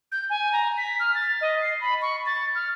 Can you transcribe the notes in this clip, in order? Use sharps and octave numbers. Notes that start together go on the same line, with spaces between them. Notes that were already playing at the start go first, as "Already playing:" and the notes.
G6
G#5
A#5
B6
F6
A6
D#5
C7
B5
C#6
A6
F6